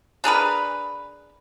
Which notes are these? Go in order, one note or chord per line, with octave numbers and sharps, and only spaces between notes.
D4 G#4 A#4 B4